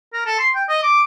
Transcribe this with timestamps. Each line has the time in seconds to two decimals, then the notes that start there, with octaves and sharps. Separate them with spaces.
0.13 A#4
0.26 A4
0.39 C6
0.55 G5
0.69 D#5
0.83 D6